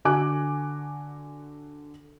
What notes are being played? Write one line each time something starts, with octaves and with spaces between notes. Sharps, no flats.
D3 F#4 G#5 D6 F#6